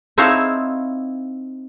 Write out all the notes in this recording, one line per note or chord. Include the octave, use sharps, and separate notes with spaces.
C4 D#4 E4 C#5 F5 A5